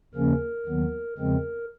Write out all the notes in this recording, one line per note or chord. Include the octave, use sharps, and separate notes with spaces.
D#2 C#3 F3 A#3 C#4 A#4
D#2 D#3 F#3 B3
E2 C#3 F3 G#3 C4 A#4